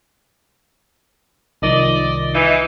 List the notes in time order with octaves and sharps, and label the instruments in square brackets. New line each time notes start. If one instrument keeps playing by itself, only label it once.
[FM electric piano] C2 D#3 F3 [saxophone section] D5 D#5
[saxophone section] E3 D#4